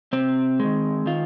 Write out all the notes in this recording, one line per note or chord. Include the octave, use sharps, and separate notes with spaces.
C3 C4
D#3 G#3
D#3 F4